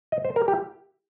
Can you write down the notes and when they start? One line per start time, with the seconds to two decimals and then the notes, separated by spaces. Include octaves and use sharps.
0.12 D#5
0.25 C5
0.36 A#4
0.48 G4